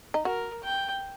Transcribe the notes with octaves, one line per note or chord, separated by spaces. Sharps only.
D#4
F#4 A#4
G5